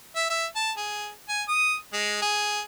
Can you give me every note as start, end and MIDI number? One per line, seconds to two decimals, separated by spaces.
0.16 0.26 76
0.30 0.46 76
0.56 0.72 81
0.77 1.11 68
1.29 1.43 80
1.48 1.76 87
1.93 2.17 56
2.22 2.62 68